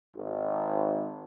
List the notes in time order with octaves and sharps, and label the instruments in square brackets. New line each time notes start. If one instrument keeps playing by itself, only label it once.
[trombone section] G#1